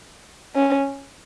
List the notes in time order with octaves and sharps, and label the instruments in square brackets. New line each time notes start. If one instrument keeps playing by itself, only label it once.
[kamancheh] C#4